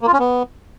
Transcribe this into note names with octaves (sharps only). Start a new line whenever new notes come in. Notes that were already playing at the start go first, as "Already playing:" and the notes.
A#3
F4
C#4
B3